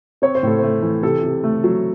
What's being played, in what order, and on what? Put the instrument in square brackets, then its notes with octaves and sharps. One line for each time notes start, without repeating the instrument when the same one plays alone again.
[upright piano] C4 C#5
C5
A2 A4
A3 C5
E3
C3 A4
C3
A3
F#3